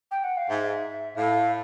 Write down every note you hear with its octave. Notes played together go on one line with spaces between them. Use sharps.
G5
F#5
F5
G#2 E5
A2 F5